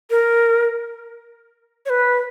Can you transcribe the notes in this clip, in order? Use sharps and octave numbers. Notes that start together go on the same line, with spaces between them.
A#4
C#5
B4